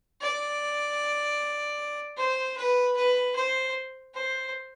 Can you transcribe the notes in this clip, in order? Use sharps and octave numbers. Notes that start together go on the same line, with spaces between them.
D5
C5
B4
B4
C5
C5